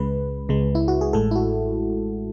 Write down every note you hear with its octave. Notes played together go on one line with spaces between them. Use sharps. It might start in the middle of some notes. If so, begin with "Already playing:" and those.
Already playing: C#2 C#3 G#3 B4
C#2 C#3 G#3
E4
F#4
G#4
A1 A2 G#3 A4
E4
F#4